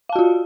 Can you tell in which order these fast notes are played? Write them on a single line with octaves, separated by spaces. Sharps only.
F5 A5 F#4 F4